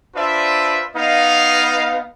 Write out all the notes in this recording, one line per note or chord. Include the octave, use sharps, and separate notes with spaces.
D4 F4 B4 C5 D5 E5
B3 D#4 D#5 F5